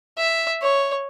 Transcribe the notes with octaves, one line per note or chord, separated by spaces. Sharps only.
E5
C#5